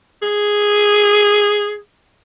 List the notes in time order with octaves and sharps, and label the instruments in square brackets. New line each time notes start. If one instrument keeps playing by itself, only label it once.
[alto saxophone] G#4